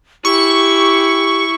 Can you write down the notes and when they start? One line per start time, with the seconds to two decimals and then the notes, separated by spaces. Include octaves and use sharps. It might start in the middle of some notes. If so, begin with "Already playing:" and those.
0.25 E4 G4 G#5 C#6